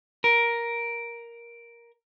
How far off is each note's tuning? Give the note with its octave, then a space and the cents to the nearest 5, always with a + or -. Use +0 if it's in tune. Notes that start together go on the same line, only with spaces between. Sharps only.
A#4 +10